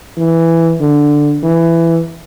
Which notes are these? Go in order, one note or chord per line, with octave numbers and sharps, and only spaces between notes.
E3
D3
E3